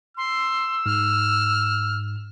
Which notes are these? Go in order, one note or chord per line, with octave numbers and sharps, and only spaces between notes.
C6 E6
G#2 F6